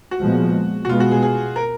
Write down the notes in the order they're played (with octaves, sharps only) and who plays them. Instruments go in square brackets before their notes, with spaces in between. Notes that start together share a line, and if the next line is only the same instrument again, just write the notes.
[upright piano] F#4
[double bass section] A#2 F3 G#3 B3
[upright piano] F#4
[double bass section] B2 G#3 B3 [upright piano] F4
[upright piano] F#4
G#4
G#4
A#4